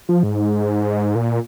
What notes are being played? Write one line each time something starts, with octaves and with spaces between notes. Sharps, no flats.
F3
G#2
A#2